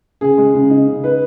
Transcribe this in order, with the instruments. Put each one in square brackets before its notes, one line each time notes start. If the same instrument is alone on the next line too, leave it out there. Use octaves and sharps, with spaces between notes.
[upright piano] C#3 G#4
G#3
C#3
D#4
C#3
D#4 B4